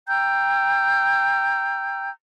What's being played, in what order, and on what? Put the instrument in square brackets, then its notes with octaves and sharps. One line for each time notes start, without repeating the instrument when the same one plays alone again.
[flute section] G5 A#5 E6 G6